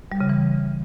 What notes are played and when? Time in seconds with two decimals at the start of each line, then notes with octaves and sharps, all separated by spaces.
0.12 G3
0.21 C#3
0.29 E3